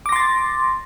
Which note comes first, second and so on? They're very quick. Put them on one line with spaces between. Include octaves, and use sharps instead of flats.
D6 A#6 C6 A6